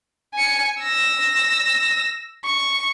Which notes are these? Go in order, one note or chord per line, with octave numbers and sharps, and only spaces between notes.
G#5 C#7
E6 A#6
C#6